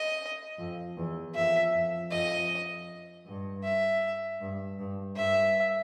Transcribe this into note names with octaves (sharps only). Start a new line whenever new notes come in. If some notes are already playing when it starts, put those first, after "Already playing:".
Already playing: D#5
F2
E2
F2 E5
F2
F2 D#5
G2
E5
G2
G2
G2 E5